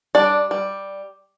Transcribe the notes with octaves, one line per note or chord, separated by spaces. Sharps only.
G3 D4 D5
G3